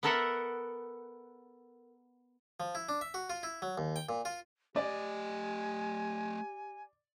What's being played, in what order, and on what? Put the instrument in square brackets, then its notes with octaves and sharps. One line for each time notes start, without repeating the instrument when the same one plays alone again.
[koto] B3 F#4 A4 A#4 E5 F#5
[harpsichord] F3
E4
D4
E5
F#4
F4
E4
F#3
D#2
G5
A#2
F4
[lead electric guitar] A3 D#5 [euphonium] G4 [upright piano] D5 [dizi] G#5